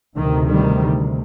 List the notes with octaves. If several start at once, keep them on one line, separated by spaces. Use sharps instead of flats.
D2 C3 D#3
D#3 G3